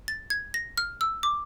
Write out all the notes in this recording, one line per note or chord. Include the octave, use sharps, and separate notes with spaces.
A6
G#6
A#6
F6
E6
D6